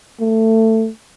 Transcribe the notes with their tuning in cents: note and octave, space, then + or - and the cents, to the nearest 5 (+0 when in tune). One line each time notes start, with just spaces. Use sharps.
A3 +20